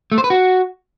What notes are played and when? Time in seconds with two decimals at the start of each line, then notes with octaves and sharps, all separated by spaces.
0.12 A3
0.18 C5
0.24 B4
0.30 F#4